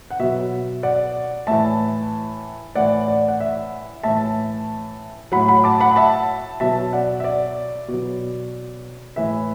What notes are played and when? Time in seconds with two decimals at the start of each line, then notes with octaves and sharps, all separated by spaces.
0.11 F#5
0.19 B2 F#3 E5
0.83 D5 F#5
1.47 A2 E3 E5 A5
2.75 A2 E3 D5 F#5
3.08 D5
3.28 F#5
3.40 E5
4.03 A2 E3 E5 A5
5.32 A2 F#3 F#5 B5
5.48 F#5 B5
5.64 A5 D6
5.80 F#5 B5
5.96 E5 A5
6.60 B2 F#3 E5 A5
6.93 D5 F#5
7.20 E5
7.24 D5
7.88 B2
7.94 F#3
9.16 A2 E3 E5